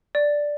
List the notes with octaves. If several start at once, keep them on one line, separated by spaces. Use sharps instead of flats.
D5